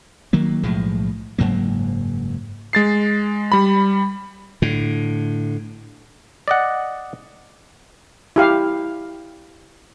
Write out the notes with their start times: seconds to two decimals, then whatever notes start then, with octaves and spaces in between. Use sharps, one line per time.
0.33 D#3 F#3 A#3
0.63 B1 A2 F3 G#3
1.39 F#1 G#2 F#3 A#3
2.73 G#3 A6 C7
3.52 G3 B5
4.62 A2 D3
6.48 D5 D#5 F#5
8.36 E4 G4 F5